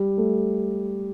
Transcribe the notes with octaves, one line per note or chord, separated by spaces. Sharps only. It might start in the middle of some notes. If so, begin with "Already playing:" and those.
Already playing: G3
A3